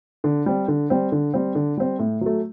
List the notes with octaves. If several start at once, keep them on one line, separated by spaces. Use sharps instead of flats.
D3
G3 C4
D3
G3 C4
D3
G3 C4
D3
G3 C4
A2
F#3 A3